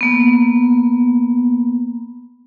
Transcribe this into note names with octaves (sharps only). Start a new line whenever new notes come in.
A#3 B3